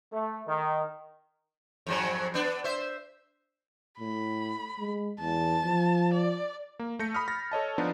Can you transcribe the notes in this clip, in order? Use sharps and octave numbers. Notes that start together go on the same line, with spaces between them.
A3
D#3
F2 G#2 F#3
B3 D4
C5 E5
A2 B5
G#3
E2 A5
F3
D5
A#3
A3 G6 A#6 C#7
B5 D#6 F6
B5 A6 A#6
A4 C#5 D#5 A5
F3 B3 D4 D#4